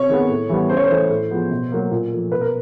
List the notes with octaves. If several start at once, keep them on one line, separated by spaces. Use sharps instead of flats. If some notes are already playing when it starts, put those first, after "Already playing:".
Already playing: C3 C#5
D#3 G#3 B3
A2
E3 G3 B3
C#3 C5
C#5
C5
E3 A3
A2
F3 G#3 B3
B2
F#3 A#3
A#2
F3 A3
B2 B4
A#4